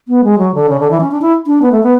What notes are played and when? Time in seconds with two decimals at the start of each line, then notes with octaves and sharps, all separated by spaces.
0.08 B3
0.24 G#3
0.38 F#3
0.54 D3
0.69 C#3
0.80 D3
0.90 E3
1.00 C#4
1.11 D4
1.21 E4
1.46 D4
1.62 B3
1.72 A3
1.83 B3